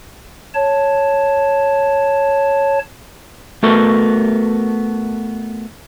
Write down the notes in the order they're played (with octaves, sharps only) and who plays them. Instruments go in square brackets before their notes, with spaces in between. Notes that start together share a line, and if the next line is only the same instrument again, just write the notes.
[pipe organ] C#5 A5
[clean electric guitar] A3 B3 F#4 A4 A#4